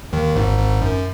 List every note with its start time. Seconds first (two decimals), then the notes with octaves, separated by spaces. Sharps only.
0.13 D#2 D#3
0.36 G#1 G#2
0.59 G#1 G#2
0.82 F#2